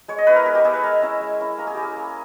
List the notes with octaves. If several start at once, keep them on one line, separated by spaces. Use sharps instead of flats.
G#3 C#5
D#5
B3 E4 B4
A#4
G#3 G#4
G4
B3 E4 G#4
B4
G#3 A#4
C#4 E4
G#3
C#4 E4
A#3 A#4
G#4
E4 G4
G#4
A#3